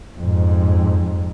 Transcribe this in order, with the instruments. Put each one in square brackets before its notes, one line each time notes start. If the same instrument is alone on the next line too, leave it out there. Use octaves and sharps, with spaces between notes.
[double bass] F2 G#2